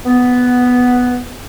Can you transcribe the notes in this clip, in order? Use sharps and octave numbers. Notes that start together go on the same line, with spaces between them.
B3